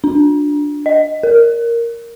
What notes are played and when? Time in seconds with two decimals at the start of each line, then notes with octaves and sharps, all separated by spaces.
0.04 D4
0.86 D#5
1.23 A#4